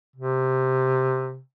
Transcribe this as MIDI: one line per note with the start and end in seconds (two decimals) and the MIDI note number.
0.16 1.40 48